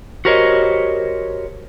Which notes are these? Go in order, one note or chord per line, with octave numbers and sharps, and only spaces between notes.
F#4 G4 A#4 C5 C#5 D#5